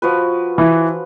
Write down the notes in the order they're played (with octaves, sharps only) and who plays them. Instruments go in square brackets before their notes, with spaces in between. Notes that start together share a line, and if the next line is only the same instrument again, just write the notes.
[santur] F3 F#4 B4
[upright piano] E3